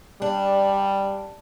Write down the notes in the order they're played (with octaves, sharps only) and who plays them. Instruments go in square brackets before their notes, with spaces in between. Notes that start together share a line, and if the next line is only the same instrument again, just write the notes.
[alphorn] G3 [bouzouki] D4